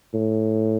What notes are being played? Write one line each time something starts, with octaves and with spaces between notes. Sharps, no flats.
A2